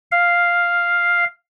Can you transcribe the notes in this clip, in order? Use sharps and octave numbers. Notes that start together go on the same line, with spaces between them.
F5